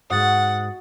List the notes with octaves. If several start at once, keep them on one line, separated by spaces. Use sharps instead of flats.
G#2 G#3 F#4 F#5 D#6 A6